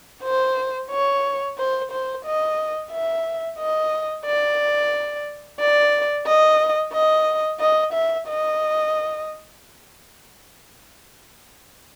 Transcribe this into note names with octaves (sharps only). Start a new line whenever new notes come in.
C5
C#5
C5
C5
D#5
E5
D#5
D5
D5
D#5
D#5
D#5
E5
D#5